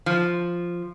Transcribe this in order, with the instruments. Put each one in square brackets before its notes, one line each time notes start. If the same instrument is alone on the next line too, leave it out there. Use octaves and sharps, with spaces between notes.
[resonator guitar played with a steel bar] F3